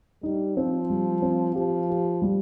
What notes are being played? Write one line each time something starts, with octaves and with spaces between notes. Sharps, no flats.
G3 D#4
F3 C4
G3
C4
F3 G4
G4
G3